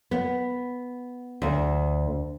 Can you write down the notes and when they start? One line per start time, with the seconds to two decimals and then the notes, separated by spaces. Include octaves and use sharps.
0.11 B3
1.42 D2